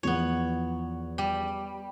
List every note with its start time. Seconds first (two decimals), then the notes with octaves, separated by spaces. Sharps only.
0.03 E2 F3 B3 C#5
1.18 G3